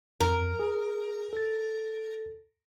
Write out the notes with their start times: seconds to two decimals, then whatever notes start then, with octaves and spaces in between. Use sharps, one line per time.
0.20 F2 A#4
0.59 G#4
1.33 A4 A6